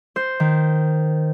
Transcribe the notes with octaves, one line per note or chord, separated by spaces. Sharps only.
C5
D#3